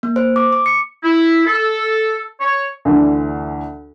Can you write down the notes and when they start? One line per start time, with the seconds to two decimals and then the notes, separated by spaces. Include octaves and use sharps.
0.03 A#3
0.16 C5
0.36 D6
0.53 D6
0.66 C#7
1.04 E4
1.46 A4
2.41 C#5
2.85 D2 D3 E3